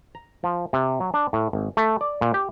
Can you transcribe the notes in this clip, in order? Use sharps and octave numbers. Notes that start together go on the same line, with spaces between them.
A#5
F3
C3
F#3
D4
A2
G#1
A3
D5
A#2
G4